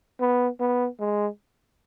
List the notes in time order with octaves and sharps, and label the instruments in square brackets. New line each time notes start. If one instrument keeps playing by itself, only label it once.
[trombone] B3
B3
G#3